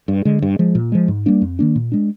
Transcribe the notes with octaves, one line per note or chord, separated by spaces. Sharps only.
G2
D3 G#3
G2
F3 G#3
A#2
F3 G#3
G#2
G3 A#3 D4
F2
D#3 A#3 D4
A#2
G#3 D4